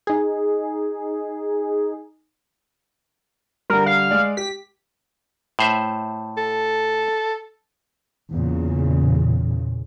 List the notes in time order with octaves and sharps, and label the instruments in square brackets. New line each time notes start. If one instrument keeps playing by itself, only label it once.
[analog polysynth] D#4 G#4
[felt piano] D3 G3 [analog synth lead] A#4
[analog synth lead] F5
[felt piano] G#3 D5
[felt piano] G4 [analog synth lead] B6
[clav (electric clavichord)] A2 C5 E5
[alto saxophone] A4
[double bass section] E2 A#2 C#3